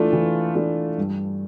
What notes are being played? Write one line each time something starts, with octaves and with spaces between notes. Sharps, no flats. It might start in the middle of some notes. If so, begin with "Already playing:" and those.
Already playing: E3 A3 D4 F4
E3
A3 D4 F4
G2